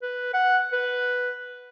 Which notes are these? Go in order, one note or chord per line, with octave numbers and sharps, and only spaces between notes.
B4
F#5
B4